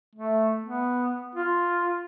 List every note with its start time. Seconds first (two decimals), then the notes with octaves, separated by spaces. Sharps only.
0.15 A3
0.63 B3
1.35 F4